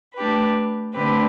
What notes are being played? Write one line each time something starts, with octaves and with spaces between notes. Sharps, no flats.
A3 D4 G4 B4
D3 A3 C4 G4 B4